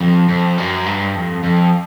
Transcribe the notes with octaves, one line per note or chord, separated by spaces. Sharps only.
F2
F2
F#2
G2
F2
F2